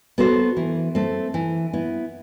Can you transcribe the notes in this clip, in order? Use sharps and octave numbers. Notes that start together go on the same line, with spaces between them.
B3 F#4 A4 C5
E3
A3 C4
E3
B3 E4